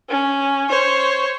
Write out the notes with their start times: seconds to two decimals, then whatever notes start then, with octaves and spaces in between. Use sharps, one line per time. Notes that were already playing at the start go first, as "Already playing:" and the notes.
0.10 C#4
0.69 C5 C#5